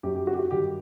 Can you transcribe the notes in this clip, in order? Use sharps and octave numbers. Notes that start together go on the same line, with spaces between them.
F#2 F#3 G4
G4
F#4
G4
F#4
G2 D#3 F#3 G4